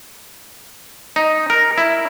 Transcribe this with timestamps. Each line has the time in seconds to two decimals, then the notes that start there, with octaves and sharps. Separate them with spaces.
1.16 D#4
1.50 A#4
1.78 E4